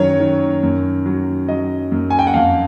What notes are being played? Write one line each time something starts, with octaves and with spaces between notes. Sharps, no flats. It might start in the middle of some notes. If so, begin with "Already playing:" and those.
Already playing: F#2 D#3 F#3 C#5
D#3
F#2
F#3
F#3 D#5
F#2
G#5
G5
F#5
F2 F5